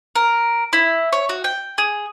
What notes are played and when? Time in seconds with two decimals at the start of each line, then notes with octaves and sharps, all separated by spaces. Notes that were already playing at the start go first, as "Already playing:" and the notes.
0.15 A#4
0.73 E4
1.13 C#5
1.29 F#4
1.44 G5
1.78 G#4